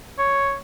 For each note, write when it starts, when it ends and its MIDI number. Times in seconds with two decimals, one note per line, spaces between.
0.19 0.56 73